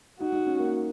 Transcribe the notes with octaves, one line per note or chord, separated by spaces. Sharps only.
D#4 F#4
D#4
C#4
A#3